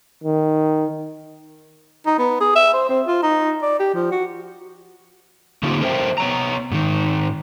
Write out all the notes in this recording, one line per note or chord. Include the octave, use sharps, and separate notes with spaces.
D#3
D#4
B3
G#4
E5
C5
C4
F4
D#4
D5
G4
F3
F#4
D3 A#3 C4 D#4 F4 G4
A4 A#4 C5 E5 G5
B3 C#5 A#5
G#2 D#3